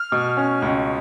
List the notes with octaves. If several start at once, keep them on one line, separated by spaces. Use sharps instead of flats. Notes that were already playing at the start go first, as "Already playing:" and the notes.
Already playing: F6
B2
C#4
C#2